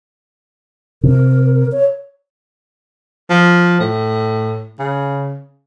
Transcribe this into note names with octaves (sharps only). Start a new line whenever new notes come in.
C3 A#4
C#5
F3
A2
C#3